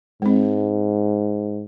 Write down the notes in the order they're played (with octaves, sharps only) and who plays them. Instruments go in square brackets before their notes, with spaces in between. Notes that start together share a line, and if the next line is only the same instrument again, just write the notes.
[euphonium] G#2 [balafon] G#3 C4